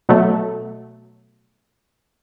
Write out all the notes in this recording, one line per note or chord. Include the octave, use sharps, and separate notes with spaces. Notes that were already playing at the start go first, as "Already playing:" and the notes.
B2 F#3 A3